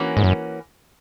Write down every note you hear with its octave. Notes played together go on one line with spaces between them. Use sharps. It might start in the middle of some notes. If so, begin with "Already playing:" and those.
Already playing: E3 A#3 C#4 F#4
G#2
F#2